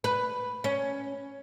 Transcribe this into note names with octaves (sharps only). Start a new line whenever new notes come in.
B4
C#4